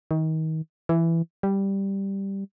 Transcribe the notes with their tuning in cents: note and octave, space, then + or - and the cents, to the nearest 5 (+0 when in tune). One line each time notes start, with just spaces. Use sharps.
D#3 +30
E3 +10
G3 +0